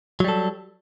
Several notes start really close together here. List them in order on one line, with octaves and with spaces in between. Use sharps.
F#3 G3 A4